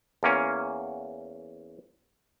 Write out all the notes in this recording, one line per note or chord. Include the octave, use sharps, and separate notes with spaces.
E2 A#3 C#4